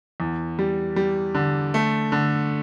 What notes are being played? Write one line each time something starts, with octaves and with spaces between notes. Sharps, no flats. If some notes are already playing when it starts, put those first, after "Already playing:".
E2
G3
G3
D3
A3
D3